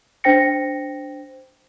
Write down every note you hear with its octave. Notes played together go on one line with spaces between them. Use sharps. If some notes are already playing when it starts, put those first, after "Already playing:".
D4 C5 G5 A#6 C#7